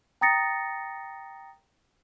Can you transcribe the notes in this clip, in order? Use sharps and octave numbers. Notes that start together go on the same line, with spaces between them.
G5 A#5 D#6 A6 A#6 C#7